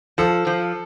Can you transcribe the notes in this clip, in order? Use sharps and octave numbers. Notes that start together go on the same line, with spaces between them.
F3 A4
F3